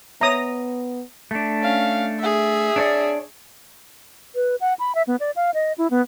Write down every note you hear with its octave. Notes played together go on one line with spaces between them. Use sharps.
B3 C#5 E5 A#5 D#6
A3 D4
C#4 F5
G#4 E5
D4 C#5 D5
B4
F#5
B5
E5
B3
D5
F5
D#5
E4
B3